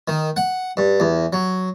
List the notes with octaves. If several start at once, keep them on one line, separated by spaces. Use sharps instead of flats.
D#3
F#5
G2
E2
F#3